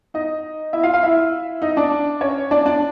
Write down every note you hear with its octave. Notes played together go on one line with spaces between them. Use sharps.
D#4 D#5
E4 E5
F4 F5
F4 F5
E4 E5
D#4 D#5
D4 D5
C#4 C#5
D4 D5
D4 D5